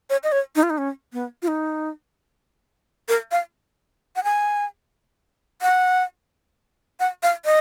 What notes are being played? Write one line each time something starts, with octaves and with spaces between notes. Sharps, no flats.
C#5
D#5
C#5
D#4
F4
D#4
C#4
B3
F4
D#4
A#4
F5
F#5
G#5
F#5
F#5
F5
D#5